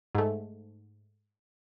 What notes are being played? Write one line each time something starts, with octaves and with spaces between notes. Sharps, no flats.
G#2 A3